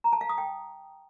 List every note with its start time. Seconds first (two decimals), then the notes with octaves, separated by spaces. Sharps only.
0.04 A#5
0.13 A5
0.21 F5
0.29 D#6
0.38 G5